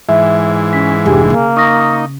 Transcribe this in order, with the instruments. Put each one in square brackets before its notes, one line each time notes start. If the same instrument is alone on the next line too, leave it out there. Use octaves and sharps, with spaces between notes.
[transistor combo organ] G#2 E3 [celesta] E5
[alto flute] C#4 [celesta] B6
[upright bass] F1 D4 [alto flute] G4 [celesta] G#4 G#5
[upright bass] C#3 [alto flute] A#3
[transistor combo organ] D#4 [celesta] C#6 D#6 A#6